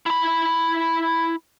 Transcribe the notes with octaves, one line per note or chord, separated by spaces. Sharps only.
E4 B5